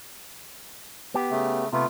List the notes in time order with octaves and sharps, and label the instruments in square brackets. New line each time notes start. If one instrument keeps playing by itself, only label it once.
[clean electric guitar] B3 G4
[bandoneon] C#3 A3
[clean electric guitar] C3 [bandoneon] A3 B3 F4